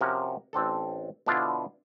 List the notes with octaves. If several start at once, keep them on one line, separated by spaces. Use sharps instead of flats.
C3 F3 C#4 F#4 A#4
A1 C4 D4 A4
B2 D3 F3 D4 E4 F4